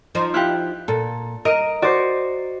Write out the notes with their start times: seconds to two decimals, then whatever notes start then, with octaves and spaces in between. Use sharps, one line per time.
0.15 F3 D#4 C5
0.34 E4 F4 G4 F#6
0.88 A#2 A4
1.45 A#4 D#5 D7 D#7
1.82 F#4 C5 D5